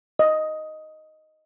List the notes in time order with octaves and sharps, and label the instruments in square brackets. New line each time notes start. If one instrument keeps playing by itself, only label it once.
[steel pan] D#5